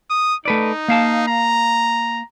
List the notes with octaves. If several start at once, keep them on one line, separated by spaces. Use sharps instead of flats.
D#6
A3 D#4 B4 D5
A#3 F5 A5
A#5